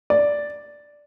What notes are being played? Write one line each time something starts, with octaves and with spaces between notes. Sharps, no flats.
D5